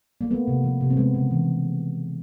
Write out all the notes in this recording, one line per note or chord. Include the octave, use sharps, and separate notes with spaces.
A#3
A3 B3
C3
F3
C3
C4
G#3 B3
C#3
E3